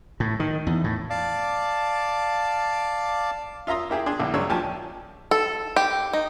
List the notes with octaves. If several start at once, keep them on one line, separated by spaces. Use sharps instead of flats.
A2
D#3
E2
A2
D5 F5 A5 D6
F4 E5 A#5 C6 D#6
A#3 E4 G4 G#4
D4 G#4 C6
A#1 D3 E4
G2 C#3 F#3 G#3 C#5 E6
D#2 F3 G4 G#5 A5
A4
G4
D#4